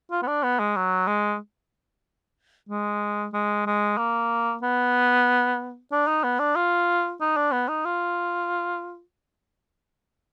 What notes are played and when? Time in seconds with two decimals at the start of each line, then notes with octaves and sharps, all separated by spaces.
0.11 F4
0.22 B3
0.27 D4
0.43 B3
0.59 G#3
0.76 F#3
1.07 G#3
2.69 G#3
3.33 G#3
3.66 G#3
3.97 A#3
4.62 B3
5.92 D4
6.07 D#4
6.23 B3
6.39 D4
6.56 F4
7.21 D#4
7.37 D4
7.52 B3
7.68 D#4
7.85 F4